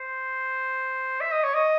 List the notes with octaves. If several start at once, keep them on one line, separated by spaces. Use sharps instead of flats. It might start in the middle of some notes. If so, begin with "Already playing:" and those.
Already playing: C5
E5
D#5
C#5
D#5